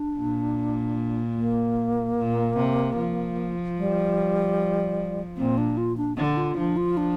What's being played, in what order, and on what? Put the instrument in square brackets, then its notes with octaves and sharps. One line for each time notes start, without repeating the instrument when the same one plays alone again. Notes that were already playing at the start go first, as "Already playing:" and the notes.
Already playing: [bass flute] D4
[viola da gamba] A#2
[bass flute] A#3
[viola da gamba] A#2
C3
F3
[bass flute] G3
[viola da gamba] A#2 [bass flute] C4
[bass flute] D4
F4
D4
[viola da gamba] D3 [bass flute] D4
[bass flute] F4
[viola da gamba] F3 [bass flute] D4
[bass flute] F4
D4